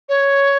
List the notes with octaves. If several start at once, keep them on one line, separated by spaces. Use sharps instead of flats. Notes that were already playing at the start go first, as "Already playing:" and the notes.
C#5